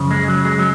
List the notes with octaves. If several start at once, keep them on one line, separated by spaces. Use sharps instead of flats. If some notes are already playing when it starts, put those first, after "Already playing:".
Already playing: F#2 C#3 F3
G#3
F#3
G#3
F#3